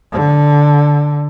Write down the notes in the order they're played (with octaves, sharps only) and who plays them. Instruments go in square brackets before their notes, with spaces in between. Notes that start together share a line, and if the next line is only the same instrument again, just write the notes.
[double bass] D3